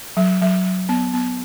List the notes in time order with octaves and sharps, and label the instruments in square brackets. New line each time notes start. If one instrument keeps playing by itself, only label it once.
[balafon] F#3
F#3
F#3
B3
B3